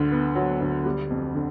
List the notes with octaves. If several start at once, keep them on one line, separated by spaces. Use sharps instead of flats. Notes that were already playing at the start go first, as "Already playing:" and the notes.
Already playing: D2 D3
B3
F#3
D2
G3
F2
D3